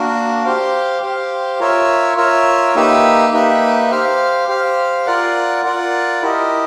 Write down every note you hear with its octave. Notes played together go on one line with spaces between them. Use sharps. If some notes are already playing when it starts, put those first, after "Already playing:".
Already playing: A#3 D4 F#4 A#4
G4 C5 F5
G4 C5 F5
F4 A#4 C#5 E5
F4 A#4 C#5 E5
A#3 D#4 G4 B4 E5
A#3 D#4 G4 B4 E5
G4 C5 F5
G4 C5 F5
F4 A#4 D5 F#5
F4 A#4 D5 F#5
E4 G4 A#4 D#5